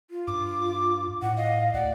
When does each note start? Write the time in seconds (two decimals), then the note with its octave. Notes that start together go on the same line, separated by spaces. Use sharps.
0.11 F4
0.27 G2 D6
1.22 A2 F#5
1.37 D#5 F5
1.73 D2 D5 F#5